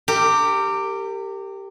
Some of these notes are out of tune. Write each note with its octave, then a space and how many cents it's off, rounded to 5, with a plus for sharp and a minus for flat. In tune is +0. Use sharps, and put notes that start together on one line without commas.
G4 +0 A#4 -35